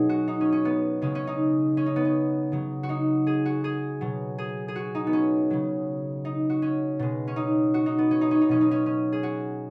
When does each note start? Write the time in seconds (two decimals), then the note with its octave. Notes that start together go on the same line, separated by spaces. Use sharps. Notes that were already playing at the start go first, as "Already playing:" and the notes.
Already playing: B2 F#3 D#4 G#4
0.09 F#4
0.28 D#4
0.41 C#4
0.52 C#4
0.65 B3
1.02 C#3 G#3 C#4
1.15 C#4
1.27 D#4
1.77 C#4
1.86 D#4
1.96 B3
2.05 C#4
2.52 C#3 F#3
2.83 F#4
2.89 D#4
3.27 G#4
3.45 F#4
3.64 G#4
4.01 B2 F#3
4.38 G#4
4.68 G#4
4.76 F#4
4.95 D#4
5.07 B3
5.13 C#4
5.50 C#3 F#3
6.25 D#4
6.50 F#4
6.62 C#4
6.99 B2 G#3
7.27 C#4
7.36 D#4
7.74 F#4
7.86 D#4
7.98 B3
8.11 C#4
8.21 D#4
8.31 C#4
8.41 D#4
8.49 B2 F#3 C#4
8.61 D#4
8.71 C#4
8.86 C#4
9.12 G#4
9.23 F#4